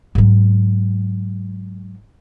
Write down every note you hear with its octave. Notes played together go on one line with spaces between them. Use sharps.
G#2 F#3